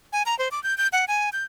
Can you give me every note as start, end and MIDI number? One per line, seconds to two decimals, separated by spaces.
0.13 0.23 80
0.26 0.37 82
0.39 0.48 72
0.51 0.62 86
0.63 0.77 91
0.78 0.88 91
0.93 1.05 78
1.08 1.30 80
1.33 1.44 91